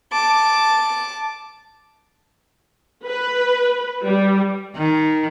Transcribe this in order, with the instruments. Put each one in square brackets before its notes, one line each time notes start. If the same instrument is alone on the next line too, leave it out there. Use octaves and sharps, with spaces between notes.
[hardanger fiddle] A5 D6
[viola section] B4
G3
[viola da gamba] D#3